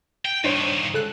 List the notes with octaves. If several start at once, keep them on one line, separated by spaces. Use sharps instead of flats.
G5
G2 D#3 D4 C5 C#5
C#2 A4 F#6